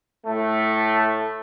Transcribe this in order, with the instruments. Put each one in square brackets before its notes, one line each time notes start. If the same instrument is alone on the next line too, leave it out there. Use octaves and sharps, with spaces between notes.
[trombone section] A2 A3